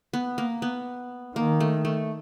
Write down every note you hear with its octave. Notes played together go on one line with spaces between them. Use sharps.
B3
A#3
B3
D#3 A#3
A3
A3